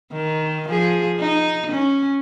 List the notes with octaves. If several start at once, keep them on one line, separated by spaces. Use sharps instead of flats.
D#3
F3 G#4
D#4
C#4